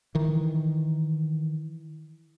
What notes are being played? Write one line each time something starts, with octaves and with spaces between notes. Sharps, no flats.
D#3 E3